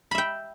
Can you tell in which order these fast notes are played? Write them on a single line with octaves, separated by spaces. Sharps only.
B5 E5 G5